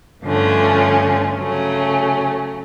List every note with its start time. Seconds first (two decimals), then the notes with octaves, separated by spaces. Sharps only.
0.23 G2 D3 F3 A3 C#4
1.37 C#3 F#3 A3 C#4